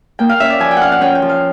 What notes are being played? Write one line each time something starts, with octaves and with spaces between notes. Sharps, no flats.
A#3 G5
F5
C#4 E5
D5
F3 G#5
G5
C#4 F5 F#5
F#5
C#4 G5
G5
F3
F5